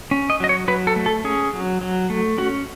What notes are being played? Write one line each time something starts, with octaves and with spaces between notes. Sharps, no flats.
C#4
D#5
F#3 D#5
C#5
F#3 B4
A4
A3
A4
C#4 G#4
F#3
F#3
A3
C#4 F#4